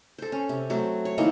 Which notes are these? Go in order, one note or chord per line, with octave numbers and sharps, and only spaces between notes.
A4 C5
C#4
C3
F#3 A3 C4
C#5
D#3 E3 A#3 C4